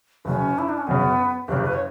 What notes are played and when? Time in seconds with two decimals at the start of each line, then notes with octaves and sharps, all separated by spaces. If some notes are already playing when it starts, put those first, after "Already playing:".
0.25 F#1 F#2 C#3 C#4
0.58 E4
0.68 D4
0.78 C#4
0.87 F#1 F#2 C#3 B3
1.48 F#1 F#2 C#3 G4
1.64 B4
1.74 C#5